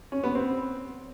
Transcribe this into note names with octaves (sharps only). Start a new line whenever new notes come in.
C#4
B3
C4